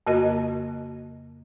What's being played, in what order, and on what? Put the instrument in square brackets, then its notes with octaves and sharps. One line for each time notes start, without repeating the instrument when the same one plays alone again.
[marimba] F2 C#3 A#3 F#4 A#4 D#5